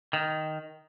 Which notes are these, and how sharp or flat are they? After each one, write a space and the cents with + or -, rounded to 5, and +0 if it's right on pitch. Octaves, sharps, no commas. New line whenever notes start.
D#3 +0